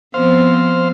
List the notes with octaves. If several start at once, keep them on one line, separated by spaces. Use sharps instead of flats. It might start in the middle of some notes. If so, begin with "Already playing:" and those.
F3 B3 C4 C5 F5